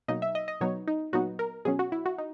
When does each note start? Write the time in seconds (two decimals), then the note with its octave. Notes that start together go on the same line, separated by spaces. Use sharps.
0.08 B2 F#3 A#3 D#4 D#5
0.22 E5
0.35 D#5
0.48 D#5
0.61 B2 F#3 B3 D#4 C#5
0.88 D#4
1.13 A#2 F#3 B3 D#4 F#4
1.39 A#4
1.65 B2 F#3 C#4 G#4
1.79 F#4
1.92 E4
2.06 F#4
2.18 D#4